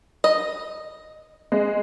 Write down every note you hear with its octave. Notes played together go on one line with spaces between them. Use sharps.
D#5
G#3